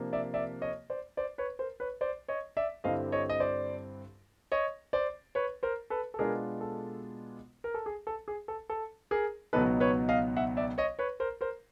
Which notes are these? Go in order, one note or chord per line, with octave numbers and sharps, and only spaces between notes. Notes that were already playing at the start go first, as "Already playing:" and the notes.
Already playing: C3 F3 A#3 D4
D5 E5
D5 E5
C#5 D#5
C5 D5
C5 D5
B4 C#5
A#4 C5
B4 C#5
C5 D5
C#5 D#5
D5 E5
G2 D3 G3 C4 E4 D#5 F5
C#5 D#5
D#5
C5 D5
C#5 D#5
C5 D5
B4 C#5
A#4 C5
A4 B4
A4
B2 G#3 B3 D4 F4 G#4 A#4
A4
A#4
A4
G#4
A4
G#4
A4
A4
G#4 A#4
C#2 B2 F#3 B3 D#4 A4 B4
B4 C#5
D#5 F5
E5 F#5
D5 E5
C#5 D#5
B4 C#5
A#4 C5
A#4 C5